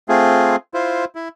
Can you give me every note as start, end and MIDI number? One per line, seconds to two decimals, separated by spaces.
0.09 0.56 57
0.09 0.56 60
0.09 0.56 65
0.09 0.56 68
0.74 1.05 64
0.74 1.05 65
0.74 1.05 72
1.15 1.28 64